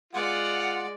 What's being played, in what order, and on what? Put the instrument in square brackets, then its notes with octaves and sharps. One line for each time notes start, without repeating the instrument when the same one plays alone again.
[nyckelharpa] G#3 D5 [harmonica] F4 [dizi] F#5